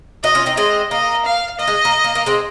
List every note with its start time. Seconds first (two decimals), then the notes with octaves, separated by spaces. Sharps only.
0.24 D#4 F#4 D#5
0.35 C#4 F4
0.46 C4 D#4
0.57 G#3 C4 D#5
0.91 A#3 D#5
1.25 F5
1.59 A#3 D#5
1.67 G#3
1.85 A#3
2.04 A#3
2.15 A#3
2.26 G#3 C4